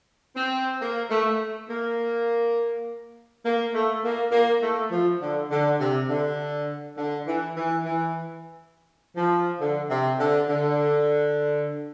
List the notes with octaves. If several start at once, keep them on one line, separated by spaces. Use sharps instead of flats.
C4
A#3
A3
A#3
A#3
A3
A#3
A#3
A3
F3
D3
D3
C3
D3
D3
E3
E3
E3
F3
D3
C3
D3
D3